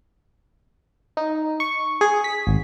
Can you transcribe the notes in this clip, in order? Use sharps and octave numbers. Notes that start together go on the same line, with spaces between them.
D#4
C#6
G#4
B6
G#1